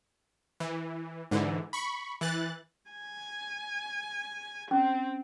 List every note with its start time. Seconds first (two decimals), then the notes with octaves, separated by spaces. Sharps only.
0.60 E3
1.31 G#2 D3 E3
1.73 B5 C#6
2.21 E3 F#6 A6
2.91 G#5
4.71 C4 C#4